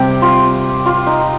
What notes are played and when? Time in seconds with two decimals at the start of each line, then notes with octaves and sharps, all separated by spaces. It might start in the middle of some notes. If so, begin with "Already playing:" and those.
Already playing: C3 G3 C4 G4
0.22 F4
0.86 F4
1.07 D#4